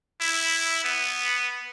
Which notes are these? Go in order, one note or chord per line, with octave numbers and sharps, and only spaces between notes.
E4
B3